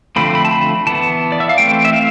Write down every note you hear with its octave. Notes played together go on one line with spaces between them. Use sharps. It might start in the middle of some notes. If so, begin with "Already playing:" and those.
D3 F3 A3 C4 B5
B5
A5
B5
E3 B3 A5
D5
E5
F5
E3 A3 C4 G5
E5
F5